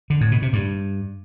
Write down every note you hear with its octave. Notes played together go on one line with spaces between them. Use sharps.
D3
A2
B2
C3
G2